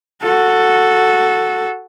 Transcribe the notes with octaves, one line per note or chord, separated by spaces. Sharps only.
F#4 A4